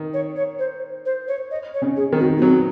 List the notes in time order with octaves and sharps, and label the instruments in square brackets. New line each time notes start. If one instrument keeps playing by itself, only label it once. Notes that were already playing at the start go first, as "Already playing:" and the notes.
Already playing: [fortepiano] D#3
[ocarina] C#5
C#5
C5
C5
C#5
D#5
C#5
[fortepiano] C#3
[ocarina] G#4
[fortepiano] D#3
[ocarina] F#4
A#3
[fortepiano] F#3 [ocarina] C4